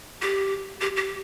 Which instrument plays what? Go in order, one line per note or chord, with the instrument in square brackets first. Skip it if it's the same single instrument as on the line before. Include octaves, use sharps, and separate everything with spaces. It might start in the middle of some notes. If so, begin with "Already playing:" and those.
[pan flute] G4
G4
G4